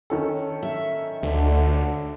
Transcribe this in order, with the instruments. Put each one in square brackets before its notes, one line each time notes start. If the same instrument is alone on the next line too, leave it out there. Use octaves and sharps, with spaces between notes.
[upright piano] D#3 C#4 A4
[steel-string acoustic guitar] E5
[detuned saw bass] D2 [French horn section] D3